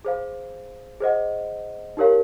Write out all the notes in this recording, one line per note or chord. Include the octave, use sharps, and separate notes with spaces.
G#4 C5 F5
G#4 C5 D#5 F#5
D#4 G4 A#4 C#5 F5